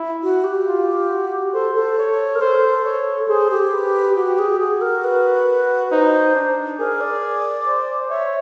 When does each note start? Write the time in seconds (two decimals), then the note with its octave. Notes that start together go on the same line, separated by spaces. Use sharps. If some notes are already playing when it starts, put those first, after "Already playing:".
Already playing: E4
0.23 F#4
0.44 G4
0.67 F4
1.09 F#4
1.54 A4 C5
1.75 A4
1.98 C#5
2.35 A#4
2.41 A4 C5
2.85 C#5
3.28 G#4 C5
3.51 G4
3.72 B4
4.16 F#4 G4
4.39 G#4
4.60 F#4 G#4
4.81 A#4
5.04 B4
5.91 D#4 C5
6.35 D4
6.79 G#4 A#4
7.01 D5
7.66 C5
8.10 C#5 E5